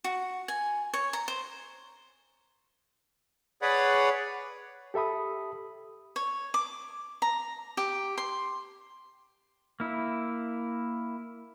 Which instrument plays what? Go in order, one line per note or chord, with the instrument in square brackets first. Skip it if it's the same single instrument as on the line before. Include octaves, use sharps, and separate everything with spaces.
[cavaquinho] F#4
G#5
C#5
A#5
C5
[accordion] G#4 B4 C#5 D5 F#5 B5
[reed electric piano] G4 A4 E5 B5 D#6
[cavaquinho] C#5
D6
A#5
G4
C6
[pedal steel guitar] A#3 E4